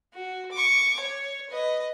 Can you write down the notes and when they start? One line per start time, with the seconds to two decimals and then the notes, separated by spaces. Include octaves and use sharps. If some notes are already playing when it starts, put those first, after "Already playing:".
0.14 F#4
0.52 C#6 D6
1.00 C#5
1.50 B4 D#5